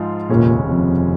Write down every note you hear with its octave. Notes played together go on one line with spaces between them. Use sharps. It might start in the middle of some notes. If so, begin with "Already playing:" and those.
Already playing: G#2 F3 G#3 F4
F1 D#2 A#2 C#3 G#3 C#4
F2